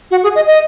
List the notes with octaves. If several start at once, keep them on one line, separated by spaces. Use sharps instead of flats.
F#4
G#4
D#5
D#5